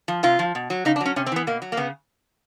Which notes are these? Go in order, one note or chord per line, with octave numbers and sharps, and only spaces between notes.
F3
C3 F4
F3
B2
F#3
C#3 D#4
D4
F#3 C#4
C3 C#4
C4
E3 B3
B2 A#3
F#3
A#3
C#3 B3